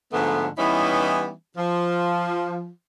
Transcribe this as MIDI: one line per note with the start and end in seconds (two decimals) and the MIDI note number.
0.13 0.47 44
0.13 0.47 50
0.13 0.47 53
0.13 0.47 57
0.13 0.47 59
0.58 1.31 52
0.58 1.31 55
0.58 1.31 59
0.58 1.31 61
0.58 1.31 63
0.58 1.31 64
1.57 2.71 53